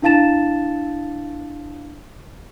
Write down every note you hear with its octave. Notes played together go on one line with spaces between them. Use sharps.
D4 E4 F5 A5 A6 E7